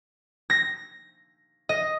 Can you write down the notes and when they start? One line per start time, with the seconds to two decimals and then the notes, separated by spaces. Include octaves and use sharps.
0.50 A#6
1.69 D#5